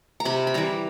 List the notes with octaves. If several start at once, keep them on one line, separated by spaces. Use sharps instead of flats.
A#5
C3 B5
B5
E3 G3 A#5